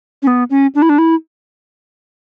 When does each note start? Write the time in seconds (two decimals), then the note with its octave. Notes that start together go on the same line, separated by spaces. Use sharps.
0.23 C#4
0.27 B3
0.50 C#4
0.75 D4
0.82 E4
0.89 D4
0.98 E4